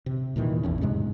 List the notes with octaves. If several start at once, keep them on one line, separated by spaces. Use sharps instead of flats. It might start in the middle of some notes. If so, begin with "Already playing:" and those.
C3
D#2 A#2 D#3 E3
A1 E2 C#4
G#2 C3 G#3